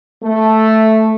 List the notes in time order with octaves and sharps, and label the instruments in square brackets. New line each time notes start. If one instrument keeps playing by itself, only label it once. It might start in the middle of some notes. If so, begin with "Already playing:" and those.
[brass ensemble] A3